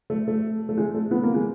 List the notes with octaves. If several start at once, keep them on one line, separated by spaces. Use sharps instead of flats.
A3
A3
A3
G#3
A3
B3
A#3
G#3